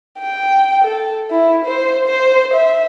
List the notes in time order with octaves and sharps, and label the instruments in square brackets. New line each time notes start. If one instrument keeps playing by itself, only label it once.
[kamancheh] G5
A4
E4
C5
C5
E5